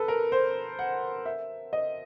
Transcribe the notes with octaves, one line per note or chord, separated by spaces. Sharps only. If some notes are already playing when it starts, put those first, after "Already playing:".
Already playing: A4 B4
A#4
C5
F#5
E5
D#5